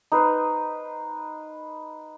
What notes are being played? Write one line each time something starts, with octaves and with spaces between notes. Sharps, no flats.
D#4 B4 C5